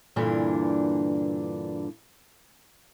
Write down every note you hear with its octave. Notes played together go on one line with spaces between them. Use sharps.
G2 A#2 D3 E3 D4